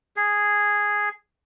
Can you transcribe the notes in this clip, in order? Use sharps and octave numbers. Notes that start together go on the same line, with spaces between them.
G#4